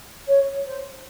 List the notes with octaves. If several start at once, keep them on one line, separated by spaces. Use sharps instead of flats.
C#5
C5